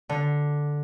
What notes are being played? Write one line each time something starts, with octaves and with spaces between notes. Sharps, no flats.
D3